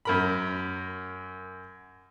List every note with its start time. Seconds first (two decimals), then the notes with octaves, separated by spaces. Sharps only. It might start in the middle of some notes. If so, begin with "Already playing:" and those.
0.05 F#2 A#4 B5